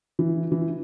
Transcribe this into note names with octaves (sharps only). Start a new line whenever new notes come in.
E3
E3